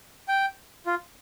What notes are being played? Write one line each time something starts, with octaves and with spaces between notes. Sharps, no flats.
G5
F4